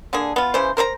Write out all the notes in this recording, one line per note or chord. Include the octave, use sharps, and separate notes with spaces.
D3 A#3 D4 G#4
B3 F4
C#3 E3 C5
A#4 C5 C#5 A#5